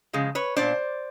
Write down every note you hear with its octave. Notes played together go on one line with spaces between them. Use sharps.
C#3 F3 G#3
B4 C#5
A#2 F#3 B3 D4 C5 D5